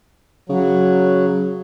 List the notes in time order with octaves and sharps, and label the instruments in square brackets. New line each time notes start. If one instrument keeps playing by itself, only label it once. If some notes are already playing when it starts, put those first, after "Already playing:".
[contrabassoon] C#3 [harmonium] F#3